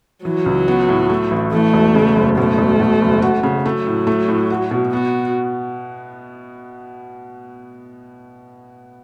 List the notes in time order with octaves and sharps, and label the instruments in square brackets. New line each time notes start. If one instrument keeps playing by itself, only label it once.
[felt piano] E3 [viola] F#3
[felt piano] C#2
B3
A2
A3
A1
[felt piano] E3 [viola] A3
[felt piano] E1
C#3
F#1
[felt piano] B2 [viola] A3
[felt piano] E1
B2
F#1
F#4
C#3
[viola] F#3 [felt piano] A3
[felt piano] A2
A3
A2
F#4
B2
[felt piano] B3 [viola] F#4